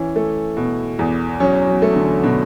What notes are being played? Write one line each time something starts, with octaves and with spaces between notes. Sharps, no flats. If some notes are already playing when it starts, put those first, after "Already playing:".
Already playing: E3 C#4
A3
B2
E2
F#3 C#4
F#3
A3
D3
B2 D3